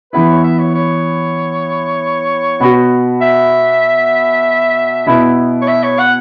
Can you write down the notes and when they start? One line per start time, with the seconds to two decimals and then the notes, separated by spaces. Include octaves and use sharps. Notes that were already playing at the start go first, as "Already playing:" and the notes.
0.12 E3 B3 E4 B4
0.28 C#5
0.44 E5
0.59 C#5
0.74 C#5
2.60 B2 B3 F#4
3.21 E5
5.06 B2 B3 E4
5.62 C#5
5.68 E5
5.83 C#5
5.99 F#5